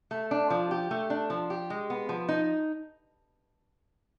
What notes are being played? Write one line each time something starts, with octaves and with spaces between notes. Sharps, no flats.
A3
D4
F3
G4
A3
D4
F3
G4
G#3
B3
F3
D#4